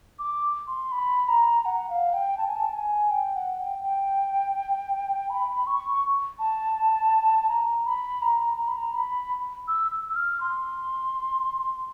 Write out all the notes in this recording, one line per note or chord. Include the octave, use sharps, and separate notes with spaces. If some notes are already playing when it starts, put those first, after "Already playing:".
D6
C6
B5
A#5
F#5
F5
G5
A5
G#5
A5
G#5
G5
F#5
G5
G5
B5
C#6
A5
A#5
B5
A#5
A#5
B5
A#5
B5
E6
E6
E6
F6
C6